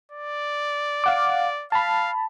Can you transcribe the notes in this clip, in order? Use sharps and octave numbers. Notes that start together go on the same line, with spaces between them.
D5
F5 F#5 D6
F5 A5 B5